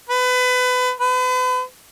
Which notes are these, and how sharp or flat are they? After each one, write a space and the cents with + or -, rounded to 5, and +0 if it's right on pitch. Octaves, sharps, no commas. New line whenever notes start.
B4 +25
B4 +40